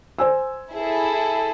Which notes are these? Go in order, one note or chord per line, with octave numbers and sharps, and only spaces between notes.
C5 G#5 E6
E4 G#4 A4